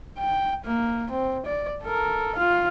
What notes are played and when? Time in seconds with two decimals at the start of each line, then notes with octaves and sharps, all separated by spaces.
0.19 G5
0.65 A#3
1.12 C4
1.46 D5
1.83 A4 A#4
2.36 F4 F5